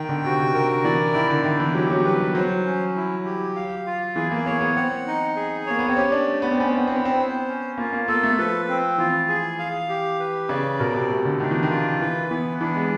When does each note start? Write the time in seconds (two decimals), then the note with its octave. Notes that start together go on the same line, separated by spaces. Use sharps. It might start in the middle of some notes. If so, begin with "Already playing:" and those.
Already playing: D#3 G5
0.09 D3
0.24 C3 F#4
0.39 C3
0.54 D3 A#4
0.84 E3 D5
1.14 D#3 E4
1.30 D3
1.44 D#3 E4
1.60 E3
1.75 F#3 G4
1.90 F#3
2.05 G3 B4
2.20 G3
2.35 F#3 C5
2.65 C#4
2.96 E4
3.25 G4
3.56 F5
3.87 F4
4.16 E3 G#4
4.32 A#3
4.46 A#3 C#5
4.61 B3
4.76 C4 F#5
5.07 D#4
5.36 G#4
5.66 A#3 C#5
5.79 B3
5.88 C4
5.97 C#4 G4
6.12 D4
6.28 A3
6.42 B3
6.52 C4
6.58 B3 C#4
6.69 C4
6.78 B3
6.87 C4 E4
6.96 B3
7.05 C4
7.14 B3 C5
7.48 C#4
7.78 A#3 F4
7.93 A#3
8.08 A#3 A4
8.23 A3
8.38 F3 B4
8.69 C4
8.98 E3 F4
9.28 G#4
9.59 F5
9.89 G4
10.19 B4
10.49 C#3 D5
10.79 B2 A#4
10.95 C3
11.10 C3 A3
11.25 D3
11.40 D#3 D4
11.51 E3
11.63 D#3
11.70 F4
12.01 E3 B4
12.31 E3 B3
12.60 E3 D4
12.76 G#3